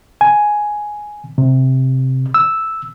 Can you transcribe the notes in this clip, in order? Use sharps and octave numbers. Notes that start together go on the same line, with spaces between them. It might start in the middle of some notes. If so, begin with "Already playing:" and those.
G#5
C3
E6